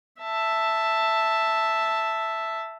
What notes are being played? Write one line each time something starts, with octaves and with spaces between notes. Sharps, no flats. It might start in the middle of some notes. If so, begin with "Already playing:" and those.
E5 A5